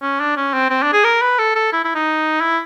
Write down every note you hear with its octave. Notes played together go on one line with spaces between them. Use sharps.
C#4
D4
C#4
C4
C4
D4
G#4
A#4
B4
A4
A4
E4
E4
D#4
E4